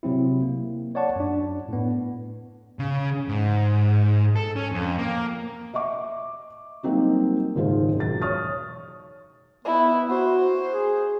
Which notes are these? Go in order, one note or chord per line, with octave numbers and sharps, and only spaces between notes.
C3 F#3 C4 E4
A#3
C#5 D5 F#5 A5 C#6
F#2 D4
A2 B3
C#3
G#2
A4
C#4
F2
A#3
D#5 E5 C#6 D6
F#3 G3 A#3 C4 D#4 F#4
F#1 D#2 G#2 F4 G#4 C5
E1 F#3 A6
C#5 C#6 D#6 F6 A6
B3 E4
F#4 C5
G#4